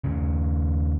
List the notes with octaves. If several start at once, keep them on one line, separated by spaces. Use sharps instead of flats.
D#2 C#3